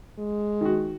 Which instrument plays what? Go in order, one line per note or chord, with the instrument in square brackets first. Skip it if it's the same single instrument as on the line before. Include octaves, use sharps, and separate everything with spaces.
[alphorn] G#3
[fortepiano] D#3 F#4